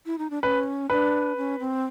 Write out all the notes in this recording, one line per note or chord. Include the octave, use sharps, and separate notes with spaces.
E4
D#4
D4
C#4 B4
D4 B4
C#4
C4